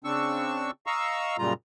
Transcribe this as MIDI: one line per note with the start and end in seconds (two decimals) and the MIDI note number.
0.04 0.71 49
0.04 0.71 60
0.04 0.71 62
0.04 0.71 85
0.04 0.71 88
0.87 1.37 75
0.87 1.37 77
0.87 1.37 82
0.87 1.37 85
0.87 1.37 88
1.38 1.53 42
1.38 1.53 46
1.38 1.53 49
1.38 1.53 55
1.38 1.53 65
1.38 1.53 82